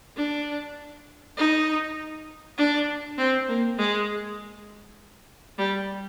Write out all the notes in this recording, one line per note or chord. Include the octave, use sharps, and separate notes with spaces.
D4
D#4
D4
C4
A#3
G#3
G3